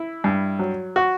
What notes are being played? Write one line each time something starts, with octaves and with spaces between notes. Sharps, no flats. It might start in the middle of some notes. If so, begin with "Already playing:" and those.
Already playing: E4
G2
F#3
F#4